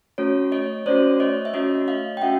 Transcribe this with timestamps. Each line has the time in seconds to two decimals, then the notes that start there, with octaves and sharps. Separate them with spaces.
0.18 A3 C#4 F#4 C#5
0.52 C#5 D#5
0.86 A3 C#4 F#4 C5 D5
1.20 C#5 D#5
1.45 E5
1.54 A3 C#4 F#4 C#5 D#5
1.88 D#5 F5
2.17 G5
2.22 A3 C#4 F#4 E5 F#5